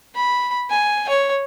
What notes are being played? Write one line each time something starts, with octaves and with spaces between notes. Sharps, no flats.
B5
G#5
C#5